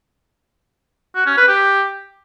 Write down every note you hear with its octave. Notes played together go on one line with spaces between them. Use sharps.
F#4
C#4
B4
G4